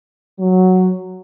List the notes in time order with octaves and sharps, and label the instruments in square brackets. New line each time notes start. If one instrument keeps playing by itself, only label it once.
[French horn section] F#3